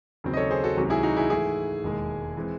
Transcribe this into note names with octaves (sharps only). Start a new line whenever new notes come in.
D#2 C#3 F#3 C4
D#5
A4 C#5
G#4 C5
F#4 A4
C#2 C3 D#3 F#3 C#4
E4 G#4
D#4 F#4
E4 G#4
G#2 E3 A3 E4 G#4
E1 D#2 D#3 G#3
E3 G#3 C4